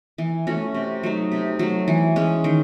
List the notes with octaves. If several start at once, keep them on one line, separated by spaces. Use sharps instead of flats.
E3
A3 C#4 F#4
C3
F#3 A3 D#4
C3
F#3 A3
E3
G#3 C#4
D#3